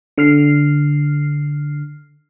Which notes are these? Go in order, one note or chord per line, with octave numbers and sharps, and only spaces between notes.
D3 F6 C7